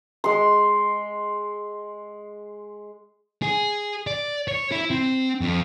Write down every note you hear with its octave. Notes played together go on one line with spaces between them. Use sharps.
G#3 C6
G#4
D5
C#5
E4
C4
F2